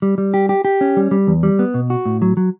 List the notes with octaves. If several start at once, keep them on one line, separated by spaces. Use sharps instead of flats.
G3
G3
G4
G4
G4
C#4
G3
G3
E2
G3
B3
B2
F#4
A2
F#3
F#3